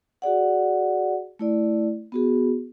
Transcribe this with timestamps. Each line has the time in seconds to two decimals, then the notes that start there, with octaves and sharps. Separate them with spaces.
0.22 F#4 G#4 D5 F#5
1.39 A3 E4 D5
2.12 B3 F#4 G#4